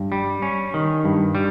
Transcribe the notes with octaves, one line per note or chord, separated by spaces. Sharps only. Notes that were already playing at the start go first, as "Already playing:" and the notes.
Already playing: G2
G3
C#4
D#3
G2
G3